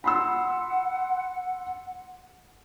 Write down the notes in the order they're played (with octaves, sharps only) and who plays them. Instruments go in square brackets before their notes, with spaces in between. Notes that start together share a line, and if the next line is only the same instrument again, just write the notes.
[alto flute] F#5 [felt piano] B5 C6 E6